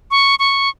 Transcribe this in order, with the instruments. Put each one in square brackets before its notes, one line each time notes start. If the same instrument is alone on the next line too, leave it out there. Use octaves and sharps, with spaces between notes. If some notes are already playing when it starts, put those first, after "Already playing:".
[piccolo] C#6
C#6